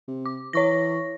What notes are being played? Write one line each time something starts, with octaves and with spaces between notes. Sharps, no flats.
C3
D6
E3 C#5 C#6 A#6